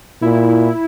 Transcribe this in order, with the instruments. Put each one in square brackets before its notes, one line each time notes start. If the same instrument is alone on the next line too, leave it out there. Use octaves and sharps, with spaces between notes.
[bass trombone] A#2 [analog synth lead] E4